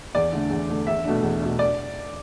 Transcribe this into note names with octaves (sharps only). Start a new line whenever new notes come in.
E2 D5
D3 A3 D4
E2
D3 A3 D4
E2 E5
B2 A3 D4
E2
B2 A3 D4
D5